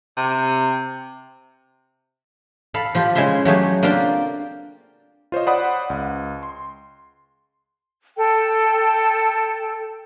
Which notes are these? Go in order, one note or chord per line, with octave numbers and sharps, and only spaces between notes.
C3
A4 F5 B5
F3 F4 G4
C#3 G#3 E4 E5 C6
F#3 A3 G4 G#4
A#3 C4 D4 F4 G4 G5
F4 C5 C#5 D#5
C5 D5 F#5 B5 D#6
C#2
C6
A4 G5